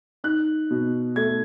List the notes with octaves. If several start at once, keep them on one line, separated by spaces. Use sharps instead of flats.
D#4 F#6
B2
A3 G#6